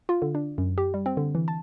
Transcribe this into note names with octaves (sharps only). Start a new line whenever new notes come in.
F4
D3
D4
F#2
G4
G3
C4
D3
E3
A5